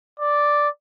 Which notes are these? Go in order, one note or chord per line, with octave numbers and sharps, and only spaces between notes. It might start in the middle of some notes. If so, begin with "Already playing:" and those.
D5